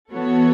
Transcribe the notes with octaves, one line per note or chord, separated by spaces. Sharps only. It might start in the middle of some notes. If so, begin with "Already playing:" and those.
E3 B3 F#4 A4 C#5